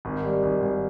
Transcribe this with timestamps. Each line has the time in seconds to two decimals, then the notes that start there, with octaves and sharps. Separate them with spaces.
0.05 G#1
0.23 G3
0.43 G#1
0.61 G#1